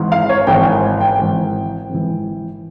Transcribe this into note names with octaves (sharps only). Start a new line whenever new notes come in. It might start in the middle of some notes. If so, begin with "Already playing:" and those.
Already playing: G#1 G#2 E3
F5
C#5
G#1 G#2 E3 G5
G#5
G5
G#1 G#2 E3
G#1 G#2 E3